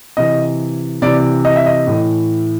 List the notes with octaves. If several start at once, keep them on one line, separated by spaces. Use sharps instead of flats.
C3 E3 D#5
C3 E3 D5
D#5
E5
D#5
A2 E3